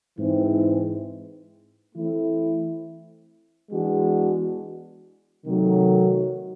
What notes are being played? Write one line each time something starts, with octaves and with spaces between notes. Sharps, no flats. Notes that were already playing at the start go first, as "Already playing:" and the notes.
G#2 E3 G#3 C4
E3 A3 C4 E4
E3 G#3 B3 D4 F#4
C3 D#3 F#3 A3